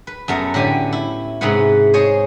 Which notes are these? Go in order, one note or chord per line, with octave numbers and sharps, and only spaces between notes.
B4
F#2 A3 B3 A#5
A2 D3 G4 G#5
E4
G#2 C3 G#4 B4 F#5
G#4 C5 C#5 D#5